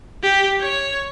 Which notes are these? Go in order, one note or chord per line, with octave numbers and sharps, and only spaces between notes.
G4
C#5